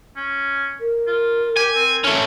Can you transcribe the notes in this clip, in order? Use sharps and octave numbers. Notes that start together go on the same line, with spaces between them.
C#4
A#4
F4
G4 G#5
C4
A3 C#4